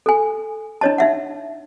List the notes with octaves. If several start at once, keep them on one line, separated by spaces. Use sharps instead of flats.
A4 G#5
D4 E4 C#5 D#5 A5
D#4 E5 F#5